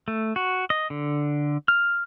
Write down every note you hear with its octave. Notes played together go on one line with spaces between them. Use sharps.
A3
F#4
D#5
D3
F6